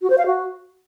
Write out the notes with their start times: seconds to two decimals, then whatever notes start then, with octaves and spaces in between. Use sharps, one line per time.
0.02 F#4
0.10 C5
0.18 F5
0.26 F#4